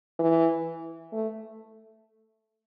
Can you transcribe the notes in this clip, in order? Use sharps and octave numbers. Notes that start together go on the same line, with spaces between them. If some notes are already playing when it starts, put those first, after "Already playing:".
E3
A3